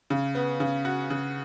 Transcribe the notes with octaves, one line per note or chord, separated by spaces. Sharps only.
C#3
B3
C#3
F#4
C#3